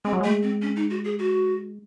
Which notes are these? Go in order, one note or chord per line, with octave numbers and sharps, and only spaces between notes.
G#3 C4
F#3
G#3 A3
C4
C#4
D#4
F#4
G#4
F#4